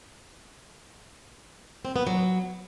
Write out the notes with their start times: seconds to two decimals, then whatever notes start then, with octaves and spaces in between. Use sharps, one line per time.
1.85 C4
1.96 B3
2.07 F#3